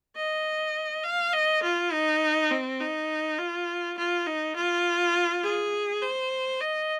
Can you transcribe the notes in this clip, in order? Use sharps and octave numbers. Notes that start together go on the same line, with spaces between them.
D#5
F5
D#5
F4
D#4
C4
D#4
F4
F4
D#4
F4
G#4
C5
D#5